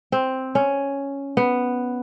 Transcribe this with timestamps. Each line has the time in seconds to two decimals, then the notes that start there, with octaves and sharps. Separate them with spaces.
0.12 C4
0.55 C#4
1.37 B3